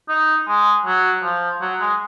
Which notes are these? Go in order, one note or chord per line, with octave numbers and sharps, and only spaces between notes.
D#4
G#3
F#3
F3
F#3
G#3